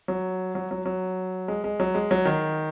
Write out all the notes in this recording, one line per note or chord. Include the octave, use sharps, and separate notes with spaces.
F#3
F#3
F#3
F#3
G#3
G#3
F#3
G#3
F#3
D#3